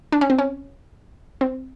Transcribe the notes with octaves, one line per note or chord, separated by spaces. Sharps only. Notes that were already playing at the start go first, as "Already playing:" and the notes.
D4
C#4
C4
C#4
C4